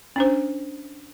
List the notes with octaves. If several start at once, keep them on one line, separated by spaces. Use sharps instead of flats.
C#4 D4 C5